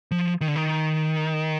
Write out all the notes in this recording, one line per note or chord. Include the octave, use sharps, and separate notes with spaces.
F3
D#3
D3
D#3